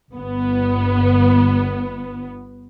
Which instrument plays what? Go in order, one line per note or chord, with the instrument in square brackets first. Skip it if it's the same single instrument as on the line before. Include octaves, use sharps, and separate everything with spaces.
[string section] G1 B3